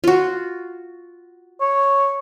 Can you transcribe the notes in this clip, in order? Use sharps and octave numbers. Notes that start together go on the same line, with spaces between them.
F4 F#4
C#5